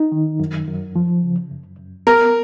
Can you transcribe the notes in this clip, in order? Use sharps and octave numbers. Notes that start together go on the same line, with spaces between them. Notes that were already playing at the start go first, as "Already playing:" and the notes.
Already playing: D#4
D#3
F#2
F#2
F3
C#3
F#2
F#2
B3 A#4